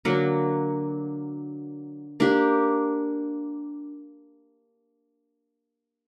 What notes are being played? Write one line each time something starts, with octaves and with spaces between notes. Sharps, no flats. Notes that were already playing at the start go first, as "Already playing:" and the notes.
D3 F#3 A#3
A#3 D4 G4